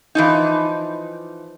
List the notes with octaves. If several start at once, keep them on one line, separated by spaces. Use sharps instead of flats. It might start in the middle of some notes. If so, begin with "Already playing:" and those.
E3 F3 D#4